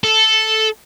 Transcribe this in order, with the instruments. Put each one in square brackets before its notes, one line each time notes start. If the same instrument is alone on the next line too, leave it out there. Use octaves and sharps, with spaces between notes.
[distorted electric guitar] A4